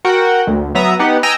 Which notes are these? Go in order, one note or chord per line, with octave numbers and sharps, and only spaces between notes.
F#4 A#4 F#5 G5
D2
F#3 B3 E5 A#5 D#6
B3 D#4 G4 F#5
D#5 G5 G#5 A#5 E6 A#6